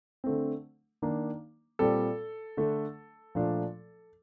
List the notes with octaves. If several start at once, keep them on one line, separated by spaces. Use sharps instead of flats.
D3 A3 C4
D#3 A#3 D4
A#2 G3 C4 A4
D3 A3 D4
A#2 F3 A3 D4